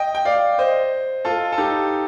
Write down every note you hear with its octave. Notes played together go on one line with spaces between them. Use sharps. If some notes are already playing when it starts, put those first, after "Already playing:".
Already playing: D#5 G5
G5
D5 F5
C5 D#5
F4 A4
A4
D#4 G4